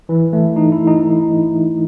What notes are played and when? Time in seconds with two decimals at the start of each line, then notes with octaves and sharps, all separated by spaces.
0.09 E3
0.33 A3
0.56 D#4
0.72 E4
0.87 D#4